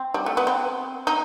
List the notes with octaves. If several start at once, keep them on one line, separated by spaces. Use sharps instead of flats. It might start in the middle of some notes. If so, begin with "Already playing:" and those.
Already playing: C4
G3
A3
B3
C4
D#4